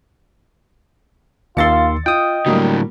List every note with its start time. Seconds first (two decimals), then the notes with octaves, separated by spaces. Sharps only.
1.57 D#2 D#3 F4 C6 E6 A6 C#7
2.06 F4 D#5 G5 D#6
2.46 A2 D3 F#3 G3 A#3